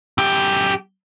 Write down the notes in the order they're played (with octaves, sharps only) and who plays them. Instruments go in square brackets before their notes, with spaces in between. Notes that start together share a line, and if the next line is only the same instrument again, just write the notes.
[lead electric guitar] F#2 G4